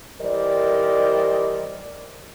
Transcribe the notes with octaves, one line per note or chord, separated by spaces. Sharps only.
E3 G3 A#4 C5 D5 D#5